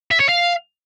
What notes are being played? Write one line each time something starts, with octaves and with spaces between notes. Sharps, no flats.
E5
C#5
F5